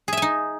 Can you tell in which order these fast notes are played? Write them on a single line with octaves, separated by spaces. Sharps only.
G#4 E5 G#5 D#4